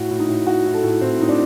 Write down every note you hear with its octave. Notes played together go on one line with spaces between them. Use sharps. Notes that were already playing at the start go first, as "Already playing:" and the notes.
Already playing: A2 F#4
A2
D#4
A2
A2 F#4
A2
A4
A2
A2 C4
A2 D#4
D4